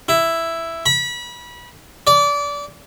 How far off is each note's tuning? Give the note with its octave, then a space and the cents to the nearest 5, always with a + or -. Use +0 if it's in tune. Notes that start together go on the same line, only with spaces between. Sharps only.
E4 +5
B5 -30
D5 -25